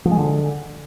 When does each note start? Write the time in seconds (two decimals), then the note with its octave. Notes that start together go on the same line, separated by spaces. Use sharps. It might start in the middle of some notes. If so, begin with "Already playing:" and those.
0.05 F3
0.11 G#3
0.18 D3